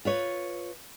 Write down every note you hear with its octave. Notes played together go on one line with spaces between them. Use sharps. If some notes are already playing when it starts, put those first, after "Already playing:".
F4 B4 C#5